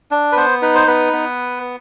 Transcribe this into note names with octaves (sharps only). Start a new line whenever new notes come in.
D4
B4
B3 C5
D#4 B4
C5
B3 B4
B3